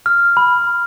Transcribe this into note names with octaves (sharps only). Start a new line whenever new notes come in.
F6
B5